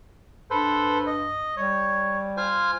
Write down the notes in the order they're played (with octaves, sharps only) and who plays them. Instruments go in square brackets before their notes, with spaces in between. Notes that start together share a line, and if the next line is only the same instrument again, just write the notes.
[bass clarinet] G2 [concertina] A4 B4 C5
[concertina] D#5
[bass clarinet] G3 [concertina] C#5
[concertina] F4 C5 G#5